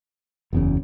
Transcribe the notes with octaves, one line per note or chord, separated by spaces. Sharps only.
F#1 E2 C#3